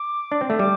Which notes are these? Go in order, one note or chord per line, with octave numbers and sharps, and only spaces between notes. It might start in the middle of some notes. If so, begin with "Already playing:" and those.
Already playing: D6
D4
C4
A3
G3 D6